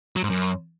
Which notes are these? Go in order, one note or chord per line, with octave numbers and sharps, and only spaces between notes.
F#3
G#2
F#2